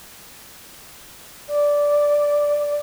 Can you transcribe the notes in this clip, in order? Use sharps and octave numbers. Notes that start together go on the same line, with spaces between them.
D5